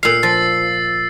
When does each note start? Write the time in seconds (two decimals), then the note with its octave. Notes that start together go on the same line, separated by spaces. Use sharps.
0.03 A#2 F5 E6 C7
0.23 F3 A6